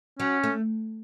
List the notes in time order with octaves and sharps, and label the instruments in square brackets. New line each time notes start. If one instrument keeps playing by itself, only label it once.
[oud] F#3 [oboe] C#4
[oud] A3